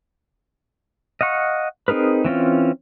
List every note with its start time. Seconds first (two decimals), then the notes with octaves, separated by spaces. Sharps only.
1.21 D#5 F5 F#5 C#6
1.88 C4 D#4 G#4 A#4 B4
2.25 E3 C4 C#4 F4